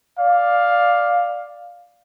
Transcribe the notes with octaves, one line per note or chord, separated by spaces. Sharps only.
D5 F5